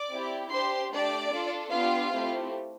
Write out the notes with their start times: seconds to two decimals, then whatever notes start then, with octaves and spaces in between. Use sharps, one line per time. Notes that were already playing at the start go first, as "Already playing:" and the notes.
Already playing: D5 D6
0.10 C4 E4 G4
0.51 D4 G4 C5 C6
0.92 A3 D4 G4 D5
1.31 D4 F4 A4
1.71 B3 D4 F4 G4 F5
2.12 A3 C4 E4 G4